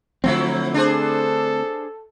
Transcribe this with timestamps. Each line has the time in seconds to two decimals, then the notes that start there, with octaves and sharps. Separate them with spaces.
0.24 D3 F3 F#3 A3 C4 E4
0.74 D4 G#4 A4 C5